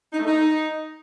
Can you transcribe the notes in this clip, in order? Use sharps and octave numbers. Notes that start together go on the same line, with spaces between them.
D#4
A3
D#4